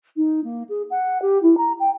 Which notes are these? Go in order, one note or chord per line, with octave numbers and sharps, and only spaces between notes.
D#4
A#3
G#4
F#5
G4
E4
A#5
G5